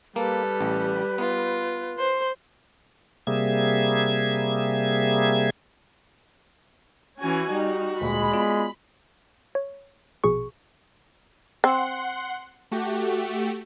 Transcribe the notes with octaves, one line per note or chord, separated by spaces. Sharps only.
G3 A#3 A4 B4
A1
B3 F4
C5 C6
C3 G3 A#3 G#4 E5 G#6
E3 C#4 F#4 G#5
G3 D#4
D2 A#2 G#3 B5
B3 F4 D5
C#5
A#1 B2 G#4 C#6
C4 F#5 C6
A3 F#4 G4